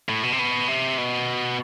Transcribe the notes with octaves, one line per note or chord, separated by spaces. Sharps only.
A2
B2
C3
B2
C3
B2